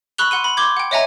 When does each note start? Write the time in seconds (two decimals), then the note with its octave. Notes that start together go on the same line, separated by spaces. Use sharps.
0.18 B5 C#6 E6 F#6 F7 G7
0.31 F#5 C6 D#7
0.44 B5
0.57 C6 D6 G6 G#6
0.77 F#5 G5
0.91 C#5 D#5 E5 F#5 G#5 A#5